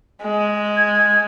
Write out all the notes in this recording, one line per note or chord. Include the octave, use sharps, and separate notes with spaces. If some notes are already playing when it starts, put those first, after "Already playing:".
G#3
G#6